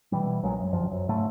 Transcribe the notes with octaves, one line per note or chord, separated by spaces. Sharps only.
B2 E3 G3
A#1 A#2 F#3 G#3
F#2
G1 F#2 F3
F#2
G#2 C#3 A3